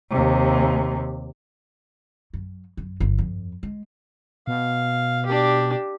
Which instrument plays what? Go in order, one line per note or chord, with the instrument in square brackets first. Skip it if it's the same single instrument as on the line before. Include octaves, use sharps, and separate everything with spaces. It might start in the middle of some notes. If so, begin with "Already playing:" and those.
[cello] D#2 C3
[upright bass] F#2
F#2
G1
F2
G#3
[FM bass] B2 [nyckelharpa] F5
[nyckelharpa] D4 G4